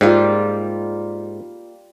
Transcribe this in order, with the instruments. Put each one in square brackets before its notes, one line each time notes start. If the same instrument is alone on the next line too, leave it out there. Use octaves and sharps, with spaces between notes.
[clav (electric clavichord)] G#2 [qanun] G3 A#3 F4